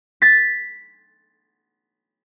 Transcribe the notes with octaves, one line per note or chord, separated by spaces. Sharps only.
A6 B6